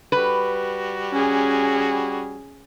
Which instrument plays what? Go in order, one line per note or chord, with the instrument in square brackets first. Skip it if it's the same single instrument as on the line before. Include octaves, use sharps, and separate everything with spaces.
[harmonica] G3 F#4 [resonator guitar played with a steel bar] B4
[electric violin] C#4 G#4